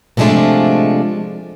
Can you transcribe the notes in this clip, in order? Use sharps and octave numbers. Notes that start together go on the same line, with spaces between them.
C3 F3 G#3 A3 D4 F4